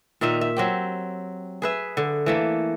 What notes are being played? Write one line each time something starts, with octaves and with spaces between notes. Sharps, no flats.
A#2 D#3 D#4 E5
E5
F#3 C4 G4
G#4 B4 E5
D3
E3 A3 A#3